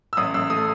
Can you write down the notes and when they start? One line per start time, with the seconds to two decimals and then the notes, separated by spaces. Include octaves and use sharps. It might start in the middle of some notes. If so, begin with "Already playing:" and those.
0.13 E6
0.17 A1 D#6
0.34 A1 E6
0.50 A3 D#6